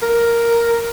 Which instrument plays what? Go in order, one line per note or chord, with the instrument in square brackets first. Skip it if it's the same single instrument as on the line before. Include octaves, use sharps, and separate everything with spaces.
[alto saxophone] A#4